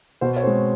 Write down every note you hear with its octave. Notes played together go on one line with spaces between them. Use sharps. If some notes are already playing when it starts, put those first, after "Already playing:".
B2 C5
C#5
G#3 C4 C5